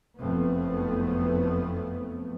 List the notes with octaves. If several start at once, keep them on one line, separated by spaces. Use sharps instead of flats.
F#1 F2 A3 B3